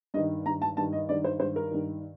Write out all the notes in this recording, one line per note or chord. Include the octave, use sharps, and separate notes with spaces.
G2 D#3 D#5
G2 D#3 A#5
A5
G2 D#3 A5
D#5
G2 D#3 D5
C5
G2 D#3 C5
A#4
G2 D#3